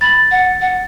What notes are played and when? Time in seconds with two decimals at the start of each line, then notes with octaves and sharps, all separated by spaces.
0.01 B5 A6
0.31 F#5
0.61 F#5